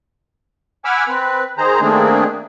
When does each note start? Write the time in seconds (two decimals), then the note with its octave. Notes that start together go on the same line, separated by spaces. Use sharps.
0.85 F#5 G#5 B5 D6 E6 F6
1.08 C4 B4
1.58 D#3 G#4 C5 A#5
1.81 D#3 A3 A#3 C4 D4 G#4